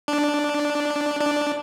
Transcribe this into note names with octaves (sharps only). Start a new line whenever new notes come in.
D4
D4